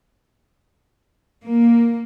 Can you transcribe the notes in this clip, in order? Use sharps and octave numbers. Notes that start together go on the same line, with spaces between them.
A#3